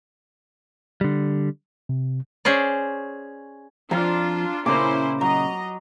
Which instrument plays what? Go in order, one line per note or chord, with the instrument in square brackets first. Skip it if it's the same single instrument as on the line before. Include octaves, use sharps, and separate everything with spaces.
[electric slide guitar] D3 G3
[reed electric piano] C3
[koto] C#4 G#4 C5 D5
[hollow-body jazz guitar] F2 F3 [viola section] D4 F4 [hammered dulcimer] A#5
[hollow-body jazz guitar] A#2 C#3 A#3 [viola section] C#4 E4 C5 [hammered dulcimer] A#5 D6
[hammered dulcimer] F#3 [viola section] D#5 A#5